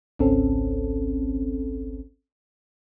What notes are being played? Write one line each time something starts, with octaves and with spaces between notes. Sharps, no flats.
G#1 C#2 C4 C#4 A4